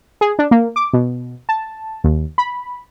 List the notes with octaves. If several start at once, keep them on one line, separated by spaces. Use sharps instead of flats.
G#4
D4
A#3
D6
B2
A5
D#2
B5